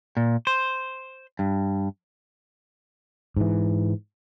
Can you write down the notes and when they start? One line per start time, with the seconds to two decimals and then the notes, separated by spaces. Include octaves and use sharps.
0.17 A#2
0.47 C5
1.39 G2
3.37 G#2 E3